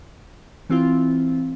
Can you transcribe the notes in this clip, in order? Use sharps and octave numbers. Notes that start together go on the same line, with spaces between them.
E3 C4 E4 F4